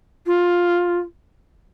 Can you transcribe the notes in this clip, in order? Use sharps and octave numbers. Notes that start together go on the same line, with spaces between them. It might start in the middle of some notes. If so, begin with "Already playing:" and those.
F4